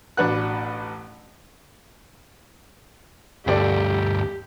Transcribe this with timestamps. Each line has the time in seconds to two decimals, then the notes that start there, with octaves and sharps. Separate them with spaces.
0.17 A1 B2 D4 B4 F#5 F#6
3.47 D2 G2 G4 A4 D5 G5